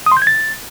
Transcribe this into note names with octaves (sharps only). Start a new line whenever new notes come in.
D#6
C6
G6
G#6
A6